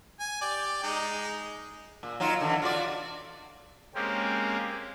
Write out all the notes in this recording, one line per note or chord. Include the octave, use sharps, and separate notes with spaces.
G#5
G4 D5
G#3 D#4
A#2
F#3 D#4 F4
D3 E3
F4 F#4 D5
G#3 A#3 C4 C#4 G4